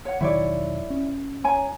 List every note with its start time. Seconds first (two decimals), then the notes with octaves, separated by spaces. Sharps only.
0.05 C#5 F#5
0.21 E1 D#3 F#3 E4 C#5 D5
0.90 C#4
1.44 C#5 G#5 A#5